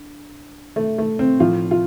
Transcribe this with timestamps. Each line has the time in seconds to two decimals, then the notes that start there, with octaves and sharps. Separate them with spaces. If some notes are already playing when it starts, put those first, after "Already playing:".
Already playing: D3
0.76 A3
0.98 A3
1.19 C4
1.40 A2 F3 F4
1.71 F4